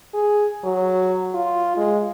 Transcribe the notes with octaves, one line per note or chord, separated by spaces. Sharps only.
G#4
F#3
F4
G#3